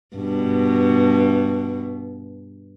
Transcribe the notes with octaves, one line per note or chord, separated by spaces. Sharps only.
G2 B2